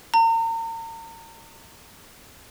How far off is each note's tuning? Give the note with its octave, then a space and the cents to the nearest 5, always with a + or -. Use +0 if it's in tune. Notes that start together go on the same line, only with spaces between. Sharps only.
A#5 -40